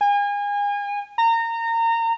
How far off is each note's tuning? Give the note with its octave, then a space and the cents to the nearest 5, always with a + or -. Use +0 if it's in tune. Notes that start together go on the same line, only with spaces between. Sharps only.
G#5 -35
A#5 -25